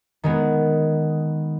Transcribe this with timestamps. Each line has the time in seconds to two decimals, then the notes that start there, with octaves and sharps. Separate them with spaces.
0.24 D#3 G#3 B3